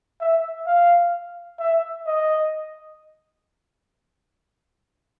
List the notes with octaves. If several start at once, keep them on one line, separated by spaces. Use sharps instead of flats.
E5
F5
E5
D#5